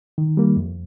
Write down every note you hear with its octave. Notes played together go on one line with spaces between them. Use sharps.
D#3
G3 A#3
F2